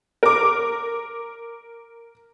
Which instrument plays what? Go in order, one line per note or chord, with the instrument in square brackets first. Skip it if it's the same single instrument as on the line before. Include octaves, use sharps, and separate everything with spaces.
[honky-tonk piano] A#4 D6